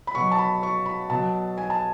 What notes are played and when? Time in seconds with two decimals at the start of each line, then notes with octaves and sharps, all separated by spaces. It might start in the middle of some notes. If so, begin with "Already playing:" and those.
0.07 B5
0.15 B2 F#3 C#6
0.32 A5
0.38 B5
0.63 C#6
0.86 B5
1.10 B2 F#3 A5
1.58 G#5
1.70 A5